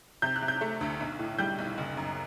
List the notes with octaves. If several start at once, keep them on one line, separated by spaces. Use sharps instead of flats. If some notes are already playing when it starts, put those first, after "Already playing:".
C3 G6
F#6
C3
G6
A3
D2
B1
A2
G3 G6
B1
F#1
F#2